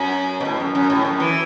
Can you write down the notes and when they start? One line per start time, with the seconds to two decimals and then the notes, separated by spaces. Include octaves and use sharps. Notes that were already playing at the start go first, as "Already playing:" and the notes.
Already playing: F#2
0.40 B2
0.45 A2
0.60 F#2
0.75 F#2
0.90 A2
1.05 F#2
1.20 E3